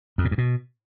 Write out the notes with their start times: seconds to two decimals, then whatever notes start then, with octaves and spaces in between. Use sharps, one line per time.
0.18 F2
0.25 A#2
0.31 G2
0.38 B2